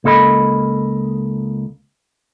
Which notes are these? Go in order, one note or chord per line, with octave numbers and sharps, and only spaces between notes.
C#2 A#3 A4 D#5 B5